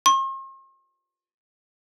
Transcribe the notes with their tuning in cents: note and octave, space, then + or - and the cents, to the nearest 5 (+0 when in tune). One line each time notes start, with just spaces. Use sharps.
C6 +45